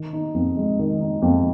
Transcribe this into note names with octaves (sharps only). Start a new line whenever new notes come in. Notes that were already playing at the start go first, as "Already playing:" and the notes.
Already playing: D#3
D#4
F2
G#3
D#3
D#4
F2